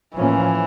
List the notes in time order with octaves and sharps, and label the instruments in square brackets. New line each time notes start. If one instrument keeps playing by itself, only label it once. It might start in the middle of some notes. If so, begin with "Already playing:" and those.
[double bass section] A2 F3 A#3 C#4 [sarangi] E3